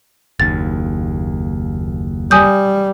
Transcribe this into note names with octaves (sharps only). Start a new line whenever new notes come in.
F#1 D#2 A6
G3 G#5 D#6 G6